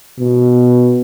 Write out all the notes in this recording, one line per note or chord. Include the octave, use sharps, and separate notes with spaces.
B2